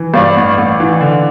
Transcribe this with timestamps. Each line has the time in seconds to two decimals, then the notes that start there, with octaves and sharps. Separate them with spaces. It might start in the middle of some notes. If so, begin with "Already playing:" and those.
Already playing: E3
0.14 G2 D5 F5
0.37 A1
0.58 A1
0.80 E3
1.01 D3